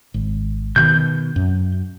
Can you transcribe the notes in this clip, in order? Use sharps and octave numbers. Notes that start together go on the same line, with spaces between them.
G#1
B2 D#3 G6
F#2